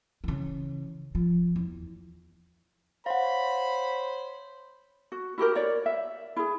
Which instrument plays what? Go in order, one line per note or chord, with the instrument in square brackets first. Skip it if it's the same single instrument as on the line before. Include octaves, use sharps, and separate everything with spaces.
[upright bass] C#3 E3
F3
E2
[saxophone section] C5 C#5 [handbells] F5 F#5 [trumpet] B5
[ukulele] F#4
E4 F#4 G4 A#4
C#5 D5
E5
E4 G#4